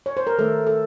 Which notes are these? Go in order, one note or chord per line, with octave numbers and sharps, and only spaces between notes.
C#5
C5
A#4
D#3 A3 A4
A4